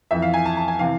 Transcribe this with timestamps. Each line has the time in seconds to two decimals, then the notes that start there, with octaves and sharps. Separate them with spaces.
0.11 F2 E3 E5
0.22 F5
0.34 G#5
0.46 A5
0.57 A5
0.68 G#5
0.79 C3 E3 F5